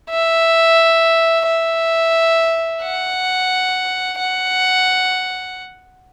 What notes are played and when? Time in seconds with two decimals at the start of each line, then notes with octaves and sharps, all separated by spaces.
0.10 E5
1.46 E5
2.83 F#5
4.19 F#5